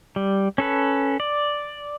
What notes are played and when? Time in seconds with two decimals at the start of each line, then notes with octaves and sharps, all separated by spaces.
0.16 G3
0.58 C#4 A4 B4
1.20 D5